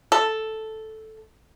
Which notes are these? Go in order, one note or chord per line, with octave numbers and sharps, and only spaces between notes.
A4